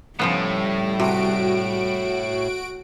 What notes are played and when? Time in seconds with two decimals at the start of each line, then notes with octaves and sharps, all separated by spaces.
0.19 A2 C#3 F3 G3 B3
1.00 C3 F#4 D7